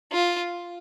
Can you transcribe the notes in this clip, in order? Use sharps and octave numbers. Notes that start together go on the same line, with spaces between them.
F4